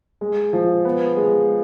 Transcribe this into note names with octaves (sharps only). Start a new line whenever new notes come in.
G#3
F3
B3
G#3